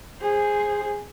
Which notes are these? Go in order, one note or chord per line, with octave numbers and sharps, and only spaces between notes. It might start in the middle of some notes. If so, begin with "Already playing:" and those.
G#4 C5